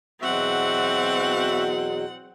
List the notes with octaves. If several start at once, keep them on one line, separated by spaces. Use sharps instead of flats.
E2 B2 F#3 C4 F#4 E5 F#5